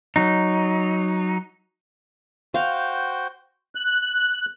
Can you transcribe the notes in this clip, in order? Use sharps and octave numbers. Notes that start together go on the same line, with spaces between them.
F#3 D#4
F#4 C5 F5 G5
F#6